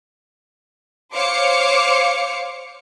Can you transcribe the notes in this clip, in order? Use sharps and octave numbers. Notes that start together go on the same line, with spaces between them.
C5 C#5 F5 D6 C#7